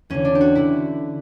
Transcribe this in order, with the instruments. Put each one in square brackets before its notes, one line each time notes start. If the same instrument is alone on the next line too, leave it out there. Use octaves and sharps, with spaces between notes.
[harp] E2 D3 C#4
D4
G4
F#4
D3 E4